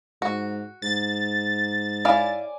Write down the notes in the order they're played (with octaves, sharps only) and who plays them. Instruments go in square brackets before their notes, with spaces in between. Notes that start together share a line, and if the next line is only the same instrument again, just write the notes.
[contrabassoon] G#2 [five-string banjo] F#4
[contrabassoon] G#2 [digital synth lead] A6
[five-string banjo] E4 F5 [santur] D5 G#5 D6